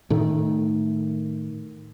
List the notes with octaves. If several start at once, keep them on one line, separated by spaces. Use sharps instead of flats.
A2 D#3 A3